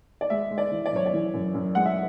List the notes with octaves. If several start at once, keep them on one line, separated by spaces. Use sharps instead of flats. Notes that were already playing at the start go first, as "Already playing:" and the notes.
D5
G#3 E5
G#3
D5
E3
D5
F#2 C#5
D5
E3
F#2
F#2
G#3 F#5
E5